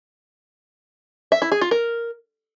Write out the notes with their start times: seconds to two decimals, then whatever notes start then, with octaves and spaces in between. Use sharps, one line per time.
1.32 E5
1.42 E4
1.52 G#4
1.61 F4
1.71 A#4